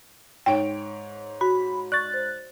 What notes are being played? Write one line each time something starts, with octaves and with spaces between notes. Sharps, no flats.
G#2 C#5 G5 D7
F#4 B5
D5 C#6 F#6 A6
C5